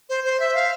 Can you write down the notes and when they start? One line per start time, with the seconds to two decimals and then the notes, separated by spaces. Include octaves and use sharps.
0.09 C5
0.24 C5
0.40 E5
0.55 F5